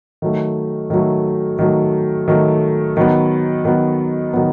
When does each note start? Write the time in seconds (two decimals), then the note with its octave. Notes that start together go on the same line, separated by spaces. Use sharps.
0.22 D#3 F#3 A3
0.90 D#3 F#3 A3
1.59 D#3 F#3 A3
2.28 D#3 F#3 A3
2.97 D#3 F#3 B3
3.65 D#3 F#3 B3
4.33 D#3 F#3 B3